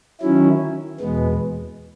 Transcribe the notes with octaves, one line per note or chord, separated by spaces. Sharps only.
D#3 F#3 C#4 E4
E2 B2 G#3 B3